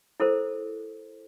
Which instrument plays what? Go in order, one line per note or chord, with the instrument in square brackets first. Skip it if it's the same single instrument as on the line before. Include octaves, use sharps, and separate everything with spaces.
[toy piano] E4 A4 A#4 C5